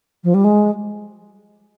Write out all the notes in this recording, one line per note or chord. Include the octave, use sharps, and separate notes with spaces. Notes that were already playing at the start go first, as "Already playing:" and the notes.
F3
G3
G#3